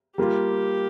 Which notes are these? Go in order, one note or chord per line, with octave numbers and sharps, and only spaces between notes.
G3 A#3 F4 G4